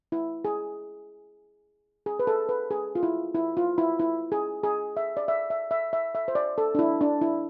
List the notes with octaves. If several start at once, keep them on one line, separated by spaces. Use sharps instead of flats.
E4
G#4
G#4
B4
A4
B4
G#4
F4
E4
E4
F4
E4
E4
G#4
G#4
E5
D5
E5
E5
E5
E5
E5
C5
D5
A4
D4
E4
D4
E4